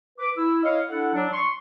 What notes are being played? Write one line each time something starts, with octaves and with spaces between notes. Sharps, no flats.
B4 D6
E4 E6
E4 C#5 D#5 F5
D4 E4 A4 F#5
F#3 D4
C6 C#6